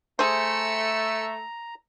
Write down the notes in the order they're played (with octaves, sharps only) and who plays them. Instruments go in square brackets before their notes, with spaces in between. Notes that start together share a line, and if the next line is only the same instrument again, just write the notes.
[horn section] A3 [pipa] G#4 C5 [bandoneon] A#5 [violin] E6 C#7